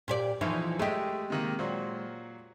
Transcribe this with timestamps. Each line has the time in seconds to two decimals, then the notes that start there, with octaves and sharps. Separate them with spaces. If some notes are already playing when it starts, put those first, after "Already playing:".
0.08 A#2 G4 D5
0.41 B1 E3 F3 D#4 E5
0.79 G#3 A3 G4 D#5 E5
1.30 C3 D#3 A#3
1.59 A#2 F#3 C5